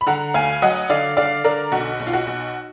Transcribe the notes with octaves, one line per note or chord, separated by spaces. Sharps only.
B5
D3 F#5 A#5
D2 F5 G#5
F#3 D#5 F#5
D3 D5 F5
D3 D5 F5
D3 A#4 D5
B1 F#4
B1
F4
F#4
B1